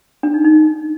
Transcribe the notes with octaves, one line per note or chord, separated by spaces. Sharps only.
D4
D#4
D#4